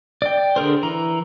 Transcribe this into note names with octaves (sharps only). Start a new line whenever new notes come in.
D5 G5
D3 G#4 A#4 C5
E3 A#5